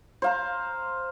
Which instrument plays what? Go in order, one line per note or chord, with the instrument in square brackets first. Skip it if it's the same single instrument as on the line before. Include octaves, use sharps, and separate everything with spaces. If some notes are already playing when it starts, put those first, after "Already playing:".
[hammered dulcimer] C5 F5 A#5